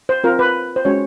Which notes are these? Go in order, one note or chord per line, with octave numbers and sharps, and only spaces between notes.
C5
C4 F4 A#4
B4
C5
G#3 C#4 F#4 C#5